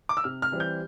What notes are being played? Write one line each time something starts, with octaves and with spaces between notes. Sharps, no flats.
D6
E6
C3 F6
F6
E3 G3 C4
G6